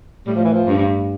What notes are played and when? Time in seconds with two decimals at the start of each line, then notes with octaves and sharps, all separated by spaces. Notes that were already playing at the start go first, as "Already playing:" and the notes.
0.26 A2 G3
0.35 F3
0.45 E3
0.53 F3
0.67 G2